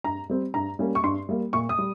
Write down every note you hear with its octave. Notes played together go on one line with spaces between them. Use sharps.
G2 A#5
G3 C4
G2 A#5
G3 A#3 C#4
C#6
G2 C6
G3 A#3
A#2 C#6
D#6
G3